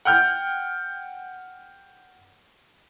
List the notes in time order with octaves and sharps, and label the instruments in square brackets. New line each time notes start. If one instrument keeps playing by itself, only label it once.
[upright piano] F#5 G5 F6 G6